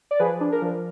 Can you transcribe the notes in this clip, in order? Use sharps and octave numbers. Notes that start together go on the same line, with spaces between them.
D5
F3 G#4 B4
D4
A#4
F3